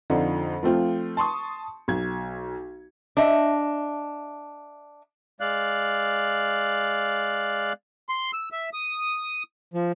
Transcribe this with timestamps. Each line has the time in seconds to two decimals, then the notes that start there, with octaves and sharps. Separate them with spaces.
0.10 F2 D3 D4 D#4 F4
0.63 F3 A3 C4 F4
1.17 A5 C6 C#6 D#6
1.88 B1 G#6
3.17 D4 D#5 E5
5.41 G#3 D5 F5 F#6
8.09 C6
8.33 E6
8.52 E5
8.73 D#6
9.74 F3